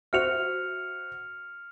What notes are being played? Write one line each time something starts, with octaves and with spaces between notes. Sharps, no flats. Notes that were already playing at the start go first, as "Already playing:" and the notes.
F#4 C5 E5 F6 C#7 F7